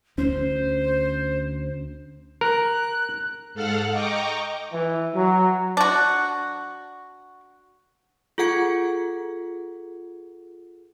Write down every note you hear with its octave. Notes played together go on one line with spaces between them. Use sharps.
D2 C#4 C5
A#4 F#6
G#2 A4 F5 F#5 F6 F#6
D#5 G5 A#5 C#6 D6
E3
F#3
D4 F#4
F4 G#4 A4 F#5 G#6 C#7